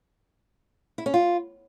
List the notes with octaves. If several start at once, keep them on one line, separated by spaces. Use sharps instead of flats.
E4
C#4
F4